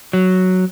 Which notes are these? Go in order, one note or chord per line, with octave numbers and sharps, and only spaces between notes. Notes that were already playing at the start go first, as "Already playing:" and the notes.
F#3